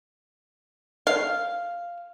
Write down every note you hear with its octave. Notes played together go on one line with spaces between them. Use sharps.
F5